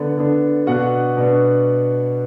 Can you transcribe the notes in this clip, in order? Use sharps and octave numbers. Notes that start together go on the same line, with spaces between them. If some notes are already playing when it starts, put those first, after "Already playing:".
Already playing: D3 B3 D4 D5
D3 B3 D4
B2 B3 D4 F#4 F#5
B2 B3 D4